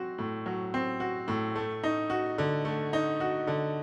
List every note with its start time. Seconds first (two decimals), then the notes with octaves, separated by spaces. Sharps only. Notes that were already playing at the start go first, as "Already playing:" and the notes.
Already playing: F#3 C4 F#4
0.18 A2
0.46 F#3
0.74 C4
1.00 F#4
1.28 A2
1.56 A3
1.84 D#4
2.10 F#4
2.38 D3
2.65 A3
2.93 D#4
3.20 F#4
3.47 D3